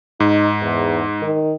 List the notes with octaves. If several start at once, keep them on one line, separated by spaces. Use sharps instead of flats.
G#2 D#4
E2
D#3